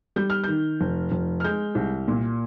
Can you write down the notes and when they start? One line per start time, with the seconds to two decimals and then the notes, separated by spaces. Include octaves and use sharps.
0.16 G3 G6
0.30 F6
0.44 D#3 G6
0.81 F1
1.12 F1
1.40 F6
1.44 G#3 G6
1.75 C2
2.08 A#2